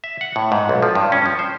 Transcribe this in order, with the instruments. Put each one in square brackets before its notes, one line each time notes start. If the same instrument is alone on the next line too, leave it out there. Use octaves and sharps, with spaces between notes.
[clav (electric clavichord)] E5
F#5
A2
G#2
B1
F3
G2
C#4
F3
C5